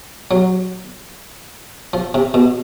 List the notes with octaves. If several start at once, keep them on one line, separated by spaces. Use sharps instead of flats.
F#3
F3
C3
B2